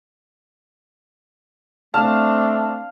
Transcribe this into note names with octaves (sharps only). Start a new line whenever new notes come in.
A3 C4 D4 F5 A5